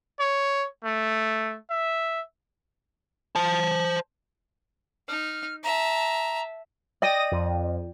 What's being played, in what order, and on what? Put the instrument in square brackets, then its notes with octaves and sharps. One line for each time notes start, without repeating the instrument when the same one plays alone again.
[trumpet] C#5
A3
E5
[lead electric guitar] C5 A5
[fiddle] D#4 [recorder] F6
[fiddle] E5 A5 [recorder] A#5
[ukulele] D5 G5 [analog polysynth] D#5 A#6 D#7
[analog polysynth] F2